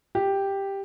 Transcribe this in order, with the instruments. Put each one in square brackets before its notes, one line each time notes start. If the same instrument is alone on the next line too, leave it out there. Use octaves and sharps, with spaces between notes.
[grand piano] G4